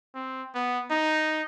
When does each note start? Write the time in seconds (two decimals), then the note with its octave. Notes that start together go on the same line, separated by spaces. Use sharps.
0.15 C4
0.54 B3
0.91 D#4